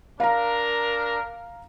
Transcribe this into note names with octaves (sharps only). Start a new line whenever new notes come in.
D4 A#4 F5 A#5